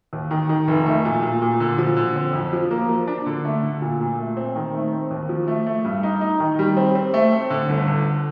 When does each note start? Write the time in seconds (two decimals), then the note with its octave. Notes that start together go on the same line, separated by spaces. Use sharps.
0.13 D#2
0.31 D#3
0.49 D#3
0.68 F1
0.86 A3
1.05 A#2
1.23 A#2
1.42 A#2
1.60 D3
1.78 F3
1.97 D3
2.16 C4
2.33 F2
2.53 F3
2.71 A#3
2.89 F3
3.07 D4
3.26 D3
3.45 A3
3.63 D3
3.82 A#2
4.00 A#2
4.18 A3
4.37 C4
4.55 D#3
4.74 A3
4.93 C4
5.11 D#2
5.29 F3
5.48 A3
5.66 A3
5.85 G2
6.03 D#4
6.21 D#4
6.40 D#3
6.59 G3
6.77 C4
6.95 C4
7.14 A3
7.32 C4
7.50 D3
7.69 G1
7.87 D3